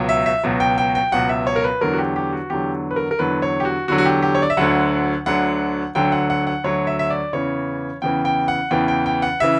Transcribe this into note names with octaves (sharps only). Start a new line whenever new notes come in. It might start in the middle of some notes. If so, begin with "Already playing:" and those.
Already playing: C#2 B2 F#3
E5
E5
C#2 B2 F#3
G5
G5
G5
C#2 B2 F#3 F#5
E5
C#5
A#4
B4
E2 D3 F#3 A#4
F#4
G4
G4
F#4
E2 D3 F#3 G4
B4
A#4
A#4
E2 D3 F#3 B4
C#5
G4
F#4
E2 D3 F#3 F#4
F#4
G4
G4
C#5
D5
E5
D2 D3 F#3 F#5
D2 D3 F#3 F#5
D2 D3 F#3 G5
F#5
F#5
F#5
D2 D3 F#3 C#5
E5
E5
D5
E2 C#3 E3 C#5
E2 C#3 E3 G5
G5
F#5
E2 C#3 E3 G5
G5
G5
F#5
C#3 E3 E5